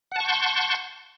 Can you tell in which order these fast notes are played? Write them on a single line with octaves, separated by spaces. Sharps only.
F#5 A5 C#6 G6 C6